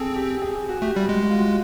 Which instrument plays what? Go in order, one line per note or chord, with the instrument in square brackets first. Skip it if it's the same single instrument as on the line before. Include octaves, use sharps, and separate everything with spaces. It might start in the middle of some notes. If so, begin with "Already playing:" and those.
Already playing: [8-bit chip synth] C4 [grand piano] G#4 A4
[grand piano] G4
G#4
G4
F#4
[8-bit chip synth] A3 [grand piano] G4
[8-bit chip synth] G3
G#3
[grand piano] F#4
F4
F#4